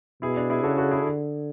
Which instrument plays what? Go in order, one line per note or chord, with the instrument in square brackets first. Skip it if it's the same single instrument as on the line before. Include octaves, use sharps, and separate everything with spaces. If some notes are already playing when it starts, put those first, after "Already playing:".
[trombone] B2 [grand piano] E4 G#4
[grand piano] D4
E4 G#4
[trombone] C#3 [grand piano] F#4 A4
[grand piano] F#4 A4
E4 G#4
[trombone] D3